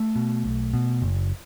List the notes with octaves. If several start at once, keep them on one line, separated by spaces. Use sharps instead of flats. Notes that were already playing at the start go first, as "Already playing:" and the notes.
Already playing: A3
B2
B1
B2
F#1